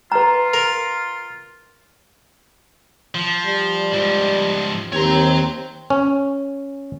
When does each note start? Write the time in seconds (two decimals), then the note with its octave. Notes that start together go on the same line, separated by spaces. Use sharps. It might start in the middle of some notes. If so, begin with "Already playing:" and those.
0.12 F4 B4 A#5
0.54 A#4
3.15 F3
3.46 G3
3.93 G#2 F3
4.93 D#2 C4 C#5 A#5
5.90 C#4